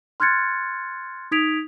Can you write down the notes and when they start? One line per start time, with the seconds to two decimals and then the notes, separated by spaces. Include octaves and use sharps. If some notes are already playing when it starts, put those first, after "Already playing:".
0.20 C6 F6 F#6 G#6 A6 C#7
1.31 D#4 D#6 G#6 B6 D7 F7